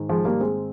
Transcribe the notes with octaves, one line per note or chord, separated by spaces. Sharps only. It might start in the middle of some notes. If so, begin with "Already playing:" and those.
Already playing: G#2 D#3
F3 G#3
G3 A#3
G#3 C4